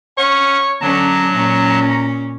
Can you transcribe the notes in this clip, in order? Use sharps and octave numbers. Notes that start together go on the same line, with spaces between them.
C#4 C#5 F#5
D3 F#3 C#4 A5 A#5
A#2 C#4